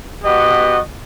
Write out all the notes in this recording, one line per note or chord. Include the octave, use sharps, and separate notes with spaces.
B3 F#4 G4 D#5